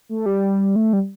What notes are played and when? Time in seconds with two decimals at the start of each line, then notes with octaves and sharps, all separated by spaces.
0.09 A3
0.26 G3
0.76 A3
0.93 G3